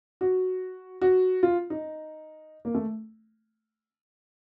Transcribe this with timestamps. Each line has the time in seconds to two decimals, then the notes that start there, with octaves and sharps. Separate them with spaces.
0.21 F#4
1.01 F#4
1.43 F4
1.70 D#4
2.65 A#3
2.74 A3